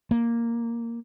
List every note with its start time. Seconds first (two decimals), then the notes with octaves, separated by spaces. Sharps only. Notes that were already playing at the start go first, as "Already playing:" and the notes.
0.11 A#3